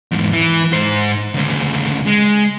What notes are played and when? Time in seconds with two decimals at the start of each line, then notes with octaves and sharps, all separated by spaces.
0.11 E2 G#2
0.32 E3
0.73 G#2 C5
1.34 D2 C#3
2.06 G#3